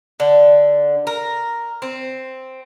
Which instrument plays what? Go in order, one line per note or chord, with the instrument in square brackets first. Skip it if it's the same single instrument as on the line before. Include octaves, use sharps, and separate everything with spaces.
[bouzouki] D3
A#4
C4